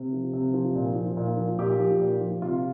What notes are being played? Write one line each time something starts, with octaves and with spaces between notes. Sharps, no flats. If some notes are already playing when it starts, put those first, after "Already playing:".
Already playing: C3
F3
C3
F3
A#2
F3
A#2
F3
A#2 G4
F3
A#2
F3
C3 F4